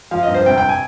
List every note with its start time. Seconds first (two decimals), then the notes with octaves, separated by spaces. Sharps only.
0.11 F3 F5
0.23 D#5
0.28 G2
0.34 C5
0.46 C3 G5
0.58 G5
0.69 G#5